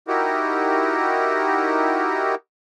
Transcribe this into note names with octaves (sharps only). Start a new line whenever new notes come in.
D#4 E4 F#4 G4 A#4